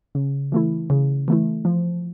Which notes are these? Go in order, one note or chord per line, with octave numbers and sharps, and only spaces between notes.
C#3
E3 A3 E4
C#3
E3 A3 E4
F3